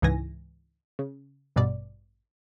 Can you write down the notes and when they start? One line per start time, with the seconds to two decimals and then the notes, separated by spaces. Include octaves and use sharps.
0.02 C#2 G#2 E3 G#5 A#6
0.99 C#3
1.56 A1 G2 B2 D5